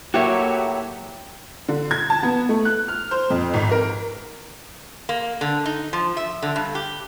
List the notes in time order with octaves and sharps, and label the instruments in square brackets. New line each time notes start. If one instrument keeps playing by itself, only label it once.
[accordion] A2 F#3 [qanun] A#3 [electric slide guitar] F#4 C#5 [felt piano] G4 E5
[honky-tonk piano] D3
G#6
A5
B3
A3
F#6
F6
C5
F2
G#1
A#4
[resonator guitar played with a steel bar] A#3
D3
D#4
F3
E5
D3
G2
G4